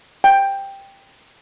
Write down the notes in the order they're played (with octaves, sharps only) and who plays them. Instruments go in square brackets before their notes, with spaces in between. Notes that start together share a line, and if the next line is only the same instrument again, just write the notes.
[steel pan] G5